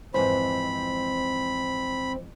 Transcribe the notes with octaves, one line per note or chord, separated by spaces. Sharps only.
F2 G#2 E3 C4 C5 B5